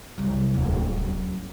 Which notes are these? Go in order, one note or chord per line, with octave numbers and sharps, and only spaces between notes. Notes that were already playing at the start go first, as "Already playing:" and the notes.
C2 F#3
D1
F#2